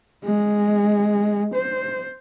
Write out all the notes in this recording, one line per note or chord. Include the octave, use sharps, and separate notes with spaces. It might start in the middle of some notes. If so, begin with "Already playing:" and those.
G#3
C5